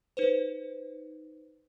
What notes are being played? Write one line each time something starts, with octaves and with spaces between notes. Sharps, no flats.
D#4 B4 C5